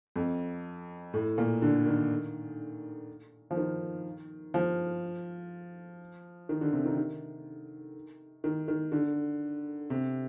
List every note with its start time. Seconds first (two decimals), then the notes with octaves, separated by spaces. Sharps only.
0.16 F2
1.13 A2
1.38 A#2
1.62 D3
1.86 D#3
3.51 F3
3.57 D#3
4.54 F3
6.49 D#3
6.61 D3
6.73 C3
6.86 D#3
6.98 D#3
8.44 D#3
8.68 D#3
8.92 D3
9.90 C3